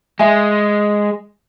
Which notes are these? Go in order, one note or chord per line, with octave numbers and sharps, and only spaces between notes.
G#3 E5 G#5